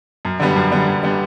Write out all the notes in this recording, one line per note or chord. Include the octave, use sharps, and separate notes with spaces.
F#2
D3 G3 B3
F#2
D3 G3 B3
F#2
D3 G3 B3